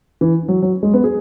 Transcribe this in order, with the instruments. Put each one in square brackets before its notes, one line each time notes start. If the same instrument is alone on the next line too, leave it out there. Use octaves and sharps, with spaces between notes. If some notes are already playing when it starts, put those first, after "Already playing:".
[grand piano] E3
F#3
F#3
G#3
B3
G#4